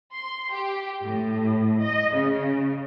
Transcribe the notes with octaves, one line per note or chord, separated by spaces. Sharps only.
C6
G4
A2
D#5
C#3